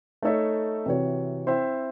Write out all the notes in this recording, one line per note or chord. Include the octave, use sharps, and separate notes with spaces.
A3 D#4 A4 C#5 E5
C3 E3 C4 F#4 C#5
C4 E4 C5 E5